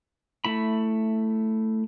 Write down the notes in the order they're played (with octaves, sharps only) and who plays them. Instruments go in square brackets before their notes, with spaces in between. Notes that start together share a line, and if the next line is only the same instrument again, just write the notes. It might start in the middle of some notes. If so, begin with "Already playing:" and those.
[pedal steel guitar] A3 E4 B5